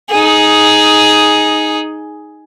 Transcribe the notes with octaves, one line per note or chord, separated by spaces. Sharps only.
D#4 G#4